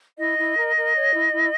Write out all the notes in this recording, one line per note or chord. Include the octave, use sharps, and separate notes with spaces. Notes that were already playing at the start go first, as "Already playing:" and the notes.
E4 D#5
E4
A#4
A#4
C#5
E4
E4